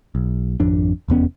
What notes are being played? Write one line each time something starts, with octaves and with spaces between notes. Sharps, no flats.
B1
G#1 F2 D4
F1 E2 B3 C#4